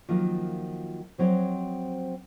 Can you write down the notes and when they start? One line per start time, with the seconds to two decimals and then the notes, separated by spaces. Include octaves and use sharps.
0.09 D#3 F3 F#3 A#3 F4
1.18 F3 F#3 C4 C#5 D#5